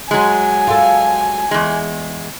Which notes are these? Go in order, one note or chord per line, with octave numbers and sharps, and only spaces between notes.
F#3 G#3 G#5
F4 A4
E2 G#3